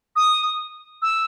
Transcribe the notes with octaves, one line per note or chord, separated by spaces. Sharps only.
D#6
E6